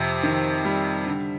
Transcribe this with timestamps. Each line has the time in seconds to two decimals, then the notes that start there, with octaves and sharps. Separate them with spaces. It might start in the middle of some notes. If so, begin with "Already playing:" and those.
Already playing: F2 C3
0.23 D#3
0.65 G3
1.07 D3